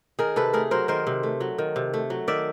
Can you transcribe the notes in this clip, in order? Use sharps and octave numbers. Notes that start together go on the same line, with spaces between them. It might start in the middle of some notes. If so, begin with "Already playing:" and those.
D#3 G#4 A#4
C3 A4 B4
A3 G#4 A#4
F#3 A#4 C5
D#3 A#4 C5
C3
A3
F#3
D#3
C3
A3
F#3
D#3 D5 E5